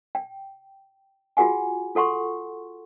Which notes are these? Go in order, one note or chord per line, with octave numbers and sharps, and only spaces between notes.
G5
F4 F#4 G#4 F#5 G#5
F4 A4 F#5 C6 C#6